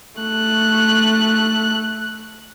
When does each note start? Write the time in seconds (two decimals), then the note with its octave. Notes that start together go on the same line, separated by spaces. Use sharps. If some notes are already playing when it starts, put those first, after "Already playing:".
0.21 A3 F#6